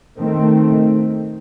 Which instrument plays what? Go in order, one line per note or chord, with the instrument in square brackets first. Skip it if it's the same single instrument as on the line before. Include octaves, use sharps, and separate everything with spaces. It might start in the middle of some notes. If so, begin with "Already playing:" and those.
[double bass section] D#3 A3 C4